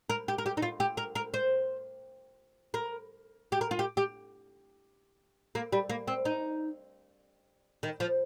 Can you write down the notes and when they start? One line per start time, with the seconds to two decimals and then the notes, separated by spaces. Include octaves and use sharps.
0.10 A#4
0.28 G4
0.38 A#4
0.46 G4
0.57 D#4
0.62 F4
0.80 G4
0.97 A#4
1.15 A#4
1.34 C5
2.74 A#4
3.52 G4
3.61 A#4
3.71 F4
3.79 G4
3.97 G4
5.55 A#3
5.72 G3
5.89 A#3
6.07 C4
6.25 D#4
7.83 D#3
8.00 F3